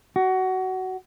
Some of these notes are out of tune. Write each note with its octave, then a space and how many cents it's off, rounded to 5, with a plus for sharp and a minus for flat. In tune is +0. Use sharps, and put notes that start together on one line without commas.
F#4 +20